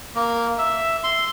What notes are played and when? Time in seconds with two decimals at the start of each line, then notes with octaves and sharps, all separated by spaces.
0.15 A#3
0.58 E5
1.04 C6